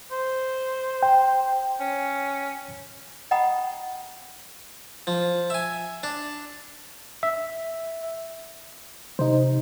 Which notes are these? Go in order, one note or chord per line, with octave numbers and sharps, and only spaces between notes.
C5
G5
C#4
D#5 F#5 G5 A#5 B5 D#6
F3
E5 G#5
D4
E5
C3 D#4 C5